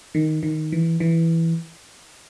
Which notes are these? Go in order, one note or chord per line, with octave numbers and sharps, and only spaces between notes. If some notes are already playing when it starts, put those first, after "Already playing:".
D#3
D#3
E3
E3